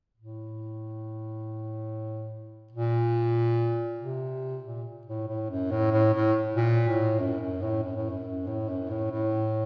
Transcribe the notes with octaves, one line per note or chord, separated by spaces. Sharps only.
A2
A#2
C3
A#2
A2
A2
F#2
A2
A2
A2
A#2
A2
F#2
F#2
A2
F#2
A2
F#2
A2
F#2
A2
A2